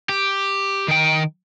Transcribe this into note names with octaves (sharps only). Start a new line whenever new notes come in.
G4
D#3 G5